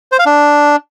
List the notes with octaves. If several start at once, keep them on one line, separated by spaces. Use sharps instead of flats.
C5
F5
D4